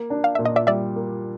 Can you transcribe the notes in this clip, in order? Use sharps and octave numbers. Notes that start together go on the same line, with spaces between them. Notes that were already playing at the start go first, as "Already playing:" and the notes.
Already playing: A#3
D4
F5
A#2 E5
D#5
D5 E5
G3 D5 E5
A#3